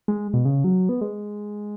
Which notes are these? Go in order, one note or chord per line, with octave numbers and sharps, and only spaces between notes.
G#3
B2
C#3
F#3
B3
G#3